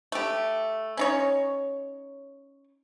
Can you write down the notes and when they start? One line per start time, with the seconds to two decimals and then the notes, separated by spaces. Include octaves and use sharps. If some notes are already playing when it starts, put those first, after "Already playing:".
0.12 A3 G4
0.97 C#4 D#4 C#5